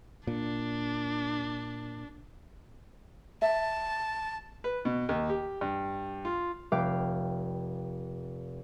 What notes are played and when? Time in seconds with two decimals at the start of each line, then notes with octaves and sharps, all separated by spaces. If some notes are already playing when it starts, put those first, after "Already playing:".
0.27 A#2 D4
3.42 E5 A5
4.64 B4
4.85 B2
5.09 D#2
5.29 G4
5.61 G2
6.25 F4
6.72 F1 B4 F5 G5 D6 G6